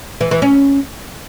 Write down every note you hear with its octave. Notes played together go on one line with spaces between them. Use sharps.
E3
E3
C#4